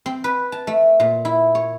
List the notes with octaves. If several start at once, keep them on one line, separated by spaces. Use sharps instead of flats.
C4
B4
A5
A3
A#2
E4
C#5